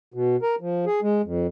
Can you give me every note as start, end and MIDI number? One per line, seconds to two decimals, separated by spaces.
0.14 0.36 47
0.42 0.55 70
0.61 0.85 53
0.86 1.00 68
1.02 1.22 56
1.24 1.47 41